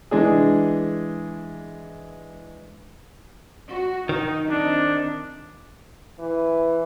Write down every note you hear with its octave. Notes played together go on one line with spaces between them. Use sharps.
E3 G#3 D4 G#4
F#4
D#3 D#4
C4 D4 D#4
E3